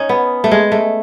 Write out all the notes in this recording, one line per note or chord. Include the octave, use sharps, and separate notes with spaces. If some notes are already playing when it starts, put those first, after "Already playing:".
Already playing: C#4 D#4
B3
A3
G#3
A3